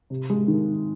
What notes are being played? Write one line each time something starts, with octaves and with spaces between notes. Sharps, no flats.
C3
G#3
D#3